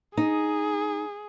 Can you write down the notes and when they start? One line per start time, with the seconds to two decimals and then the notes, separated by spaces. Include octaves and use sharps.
0.17 D#4 G#4